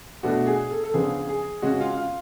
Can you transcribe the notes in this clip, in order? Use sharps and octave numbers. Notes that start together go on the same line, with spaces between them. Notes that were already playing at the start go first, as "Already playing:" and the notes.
B2 A3 D4 F#4
G#4
A4
A4
C#3 F3 B3 D4 G#4
G#4
C#3 G#3 C#4 F#4
F4
F4